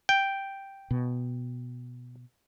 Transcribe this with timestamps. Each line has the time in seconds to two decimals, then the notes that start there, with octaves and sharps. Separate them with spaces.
0.09 G5
0.91 B2